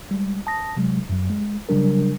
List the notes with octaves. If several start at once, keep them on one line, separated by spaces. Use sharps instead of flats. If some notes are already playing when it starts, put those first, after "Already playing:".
G3 G#3
A5 D#6 A#6
C3 F#3 G#3
F#2 F#3
G#3
C#3 F#3 G3 D4 A#4